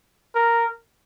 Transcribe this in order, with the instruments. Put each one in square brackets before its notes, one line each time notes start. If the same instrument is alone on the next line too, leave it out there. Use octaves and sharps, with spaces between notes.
[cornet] A#4